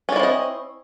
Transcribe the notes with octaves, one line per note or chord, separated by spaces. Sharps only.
C4 C#4 E4 D5 D#5